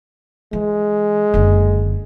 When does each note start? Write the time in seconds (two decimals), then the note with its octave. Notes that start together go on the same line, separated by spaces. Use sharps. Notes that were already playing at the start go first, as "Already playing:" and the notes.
0.53 E3 G#3
1.34 F#1 D3